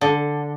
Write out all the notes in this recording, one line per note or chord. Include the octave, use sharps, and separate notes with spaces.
D3